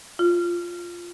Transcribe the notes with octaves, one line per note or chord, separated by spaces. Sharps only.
F4